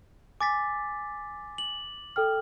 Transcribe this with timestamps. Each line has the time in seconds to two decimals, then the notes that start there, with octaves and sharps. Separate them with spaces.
0.41 G#5 D6 A6 B6
1.58 F#7
2.16 A4 G5 F6